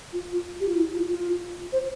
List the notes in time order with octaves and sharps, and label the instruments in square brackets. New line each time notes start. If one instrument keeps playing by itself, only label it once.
[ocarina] F4
G4
F4
E4
F4
F4
C5